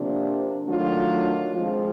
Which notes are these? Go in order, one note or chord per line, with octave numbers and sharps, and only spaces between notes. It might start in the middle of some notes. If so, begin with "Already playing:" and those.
Already playing: C3 F3 A#3 D4
D#3 F#3 A3 D4 F4
F3 G#3 C4 F4